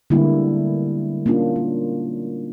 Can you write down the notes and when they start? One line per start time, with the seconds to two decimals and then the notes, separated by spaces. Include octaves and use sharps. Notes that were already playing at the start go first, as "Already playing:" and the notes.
0.10 D3 G3 G#3 A#3 B3 E4
1.26 A#3 C#4 D4 F4
1.56 C#4